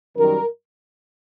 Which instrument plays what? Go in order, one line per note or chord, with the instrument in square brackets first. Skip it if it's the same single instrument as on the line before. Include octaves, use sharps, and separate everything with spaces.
[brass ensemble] F#2 D#3 G3 A#4